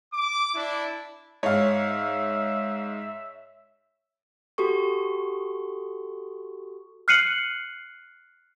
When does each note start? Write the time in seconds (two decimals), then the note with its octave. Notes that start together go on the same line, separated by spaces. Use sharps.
0.13 D6
0.54 D4 E4
1.43 G#2 C#5 E5 F5
4.58 F#4 G4 A4 C#6
7.08 F6 F#6 C7 C#7 D#7 F#7